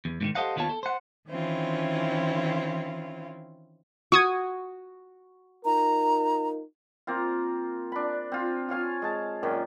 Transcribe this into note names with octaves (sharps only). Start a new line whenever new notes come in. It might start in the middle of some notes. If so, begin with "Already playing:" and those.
E2
G#2 D3 D#3
G4 A4 C5 D#5 F5 F#5
D#2 D#3 B3 F4 C#5 A5
A4
C5 F#5
D#3 E3 C4 C#4 E4 F4
F#4 C#6 D#6 G#6
D#4 F4 A#4 A#5
A#3 C4 F4
D4 B5
C4 F4
F4 C#5 F5 G#5
G#3 A5
F#2 A#2 D#3